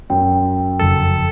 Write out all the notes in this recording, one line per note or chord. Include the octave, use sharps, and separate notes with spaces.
F#2 G5
F#1 F2 C#3 A4